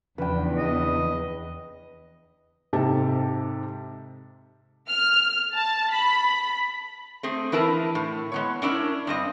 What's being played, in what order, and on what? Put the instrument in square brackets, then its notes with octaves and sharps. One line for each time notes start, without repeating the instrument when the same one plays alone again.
[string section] E2 [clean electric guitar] C#3 F3 D4 [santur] B4 G5
[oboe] D#5
[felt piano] G#2 C3 G4 A4 A5
[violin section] F6
A5
B5
[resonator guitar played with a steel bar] A3 C4 G#4
E3 D4 E4 A#4 B4 A5
A2
G#3 B3 C#5
C#4 D4 E4 A#4
G2 C4 D#5